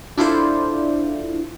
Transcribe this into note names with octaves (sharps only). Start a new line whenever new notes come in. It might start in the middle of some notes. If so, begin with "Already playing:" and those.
D4 E4 F4 A4 C5 D5